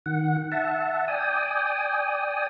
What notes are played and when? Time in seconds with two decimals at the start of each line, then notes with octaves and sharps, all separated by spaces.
0.06 D#3 F#5
0.52 E5 F#5 A5
1.08 D5 G5 G#5 D#6